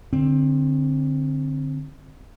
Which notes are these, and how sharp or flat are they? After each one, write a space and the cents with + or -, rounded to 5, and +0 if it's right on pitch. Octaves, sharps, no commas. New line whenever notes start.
D3 +0 C4 +10